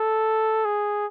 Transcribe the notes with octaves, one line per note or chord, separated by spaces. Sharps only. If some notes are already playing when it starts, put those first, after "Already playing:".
Already playing: A4
G#4